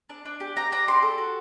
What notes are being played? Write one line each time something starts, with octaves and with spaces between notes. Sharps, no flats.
D4
D4
G4
G4 A#5
D4 A#5
G4 C6
A4
F#4